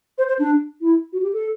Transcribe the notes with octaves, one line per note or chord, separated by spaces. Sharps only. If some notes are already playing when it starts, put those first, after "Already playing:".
C5
C5
D4
E4
F#4
G4
A4